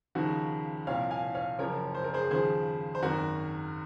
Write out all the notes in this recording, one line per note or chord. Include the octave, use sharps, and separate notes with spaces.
D#2 C#3 F3 D#4 F#4
C2 A#2 F3 C#5 F5
F5 G#5
C#5 F5
F#1 F#2 F3 A#4 C#5
C5
A#4
G#4 C5
D#2 C#3 F3 G#4 C5
C5
G#1 F#2 D#3 F#4 A#4